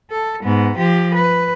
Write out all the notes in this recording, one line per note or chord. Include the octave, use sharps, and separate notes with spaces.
A4
G#2 B3
F3 G4
B4